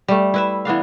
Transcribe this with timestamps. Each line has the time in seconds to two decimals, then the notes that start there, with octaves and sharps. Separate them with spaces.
0.08 G3 A3
0.34 E4 B4 E5
0.65 E3 B3 D4 F5